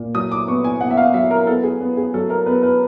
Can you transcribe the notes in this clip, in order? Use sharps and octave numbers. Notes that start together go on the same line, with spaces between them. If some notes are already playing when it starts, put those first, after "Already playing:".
Already playing: A#2
F#3 D#6
D6
B3 C#6
G#5
B2 F#5
E5
F5
F#3 E5
A#4
B3 A4
G#4
B3
G#4
F#3 A4
A#4
B3 B4
B4